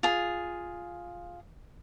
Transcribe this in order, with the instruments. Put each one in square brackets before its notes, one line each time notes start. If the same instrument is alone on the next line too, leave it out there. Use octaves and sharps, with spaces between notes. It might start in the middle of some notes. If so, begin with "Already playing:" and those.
[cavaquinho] F4 G#4